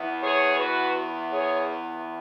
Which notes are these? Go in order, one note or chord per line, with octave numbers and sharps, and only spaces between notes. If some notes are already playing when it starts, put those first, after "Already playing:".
Already playing: E2 E3 B3
G#4 C#5
F#4 B4
G#4 C#5